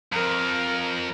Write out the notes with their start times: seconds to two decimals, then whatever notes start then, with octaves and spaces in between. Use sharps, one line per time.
0.13 F2 A#4